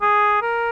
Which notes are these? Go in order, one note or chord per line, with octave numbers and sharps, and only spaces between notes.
G#4
A#4